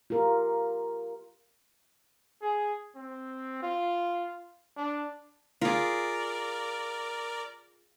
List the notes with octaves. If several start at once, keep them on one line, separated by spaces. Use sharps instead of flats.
F4 G4 A#4
G#4
C4
F4
D4
F4 G#4 A#4 D5